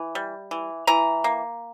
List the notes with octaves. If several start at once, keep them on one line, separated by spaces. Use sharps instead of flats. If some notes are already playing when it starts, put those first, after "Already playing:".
Already playing: E3
G3
E3
E3 A#5
A#3